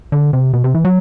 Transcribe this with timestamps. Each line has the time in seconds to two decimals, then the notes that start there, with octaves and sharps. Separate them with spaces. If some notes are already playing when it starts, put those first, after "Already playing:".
0.12 D3
0.33 C3
0.54 B2
0.64 C3
0.75 E3
0.85 F#3